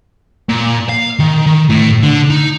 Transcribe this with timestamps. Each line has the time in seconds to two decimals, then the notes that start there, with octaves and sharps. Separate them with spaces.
0.49 A#2
0.89 F5
1.19 D#3
1.46 D#3
1.69 A2
2.03 D3
2.30 D#4